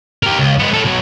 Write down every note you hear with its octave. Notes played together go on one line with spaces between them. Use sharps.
G4 A#4
C#2
G#3 B3
A4 C#5
B2 F#3